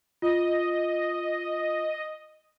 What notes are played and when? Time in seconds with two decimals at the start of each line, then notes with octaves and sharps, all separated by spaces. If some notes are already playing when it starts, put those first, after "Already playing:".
0.22 F4 D#5